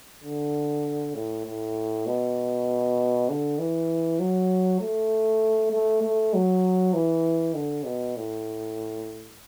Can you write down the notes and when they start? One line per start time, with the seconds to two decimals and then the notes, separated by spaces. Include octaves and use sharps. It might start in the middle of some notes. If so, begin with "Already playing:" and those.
0.24 D3
1.15 A2
1.46 A2
2.06 B2
3.29 D3
3.59 E3
4.19 F#3
4.81 A3
5.72 A3
6.02 A3
6.34 F#3
6.94 E3
7.54 D3
7.85 B2
8.16 A2